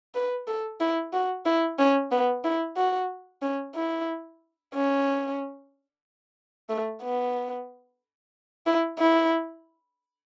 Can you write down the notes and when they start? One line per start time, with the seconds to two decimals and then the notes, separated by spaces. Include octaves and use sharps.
0.15 B4
0.47 A4
0.80 E4
1.13 F#4
1.46 E4
1.79 C#4
2.12 B3
2.44 E4
2.77 F#4
3.42 C#4
3.75 E4
4.74 C#4
6.69 A3
7.02 B3
8.66 E4
8.99 E4